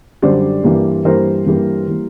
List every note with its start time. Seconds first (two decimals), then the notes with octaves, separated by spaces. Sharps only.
0.22 F#2 D3 G3 C5 D5
0.64 G2 E3 G3 A#3
1.05 G2 E3 G3 A#3 A#4 C5
1.46 G2 E3 G3 A#3
1.88 E3 G3 A#3